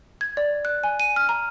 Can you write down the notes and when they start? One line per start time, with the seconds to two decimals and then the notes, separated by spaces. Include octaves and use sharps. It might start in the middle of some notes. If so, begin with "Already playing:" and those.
0.21 G#6
0.37 D5
0.65 F#6
0.84 G#5
1.00 D#7
1.16 F6
1.29 A#5